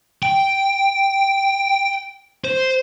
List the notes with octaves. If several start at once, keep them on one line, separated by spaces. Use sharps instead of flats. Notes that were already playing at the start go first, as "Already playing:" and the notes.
G5
C5